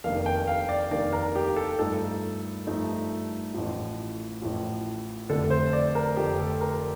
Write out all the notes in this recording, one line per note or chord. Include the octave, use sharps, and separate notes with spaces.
F1 D#2 D#3 A#3 D4 F5
G5
F5
D5
F1 D#2 D#3 A#3 D4 D5
A#4
G4
A4
G2 F3 A3 D#4 A4
G2 F3 A3 D#4
A1 A2 F3
A1 A2 F3
F1 F2 D3 A3 A4
C5
D5
A#4
F1 F2 D3 A3 G4
A4
A#4